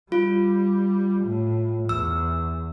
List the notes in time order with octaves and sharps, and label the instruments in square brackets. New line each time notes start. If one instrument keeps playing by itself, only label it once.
[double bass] G3 [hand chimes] F4
[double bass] A2
[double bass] E2 [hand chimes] E6